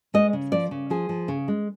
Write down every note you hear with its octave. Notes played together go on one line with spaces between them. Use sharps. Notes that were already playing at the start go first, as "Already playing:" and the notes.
G#3 D#5
C#3
F3 D5
C#3
F3 G#4
F3
C#3
G#3